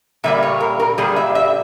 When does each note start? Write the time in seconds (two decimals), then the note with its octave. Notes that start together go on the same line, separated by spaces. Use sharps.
0.24 A#2 G3 A#3 E5
0.43 C#5
0.60 A#4
0.80 A#4
0.98 A#2 G3 G#4
1.16 E5
1.35 E5